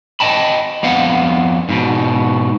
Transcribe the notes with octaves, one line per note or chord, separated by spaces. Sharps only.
D#5 G5 A5 B5
F2 B3 F5 F#5
G#2 B2